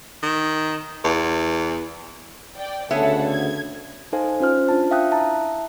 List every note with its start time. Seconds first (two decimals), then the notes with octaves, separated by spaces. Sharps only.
0.23 D#3
1.04 E2
2.56 D5 G5
2.91 D2 C#3 B3 G#4 A4 C#5 E5 F#5
3.28 G#6
4.13 D#4 A4 C5 F5 G#5
4.40 C#4 F4 C5 F6
4.69 D4 F4 A5
4.91 E5 F5 G5 D#6 F#6
5.12 E4 E5 A5 A#5